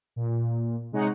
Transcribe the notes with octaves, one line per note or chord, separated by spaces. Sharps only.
A#2
C3 G#3 D#4 C#5 F#5